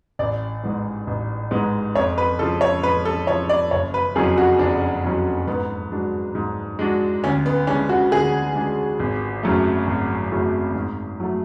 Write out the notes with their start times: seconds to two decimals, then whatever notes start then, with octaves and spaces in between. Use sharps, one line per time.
0.19 A1 D5
0.63 G#2 G#3 B3
1.07 A1
1.51 G#2 G#3 B3
1.95 F2 C#5
2.18 B4
2.39 C#3 F3 A4
2.61 C#5
2.83 F2 B4
3.05 A4
3.27 C#3 F3 C#5
3.49 D5
3.71 F#1 C#5
3.94 B4
4.15 F2 C#3 F#3 C#4 G#4
4.38 F#4
4.59 F#1 D4
5.04 F2 C#3 F#3 C#4
5.47 G#2 B3
5.92 G#3 D4 F#4
6.35 G#2
6.79 G#3 D4 F#4
7.24 D2 C#4
7.46 B3
7.67 C#3 G#3 C#4 D4
7.89 F#4
8.11 D2 G#4
8.55 C#3 G#3 D4
8.99 G#1
9.43 F#2 C#3 F#3 A3
9.87 G#1
10.31 F#2 C#3 F#3 A3
10.75 G#2
11.20 F#3 A3